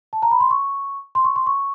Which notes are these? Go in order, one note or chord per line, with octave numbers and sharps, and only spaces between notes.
A5
A#5
B5
C6
C#6
C6
C#6
C6
C#6